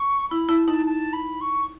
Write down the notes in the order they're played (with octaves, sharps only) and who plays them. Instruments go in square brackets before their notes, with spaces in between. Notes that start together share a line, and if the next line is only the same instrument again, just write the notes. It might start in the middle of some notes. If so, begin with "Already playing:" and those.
Already playing: [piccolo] C#6
[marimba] E4 [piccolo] B5
[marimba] E4 [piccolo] A5
[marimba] D#4 [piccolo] A5
[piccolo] A5
B5
C#6